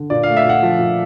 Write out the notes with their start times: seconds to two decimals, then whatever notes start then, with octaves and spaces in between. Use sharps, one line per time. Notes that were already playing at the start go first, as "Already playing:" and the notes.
Already playing: D3
0.10 A#2 D5
0.23 A3 F5
0.37 E5
0.45 A#2 F#5
0.63 F3
0.79 A#2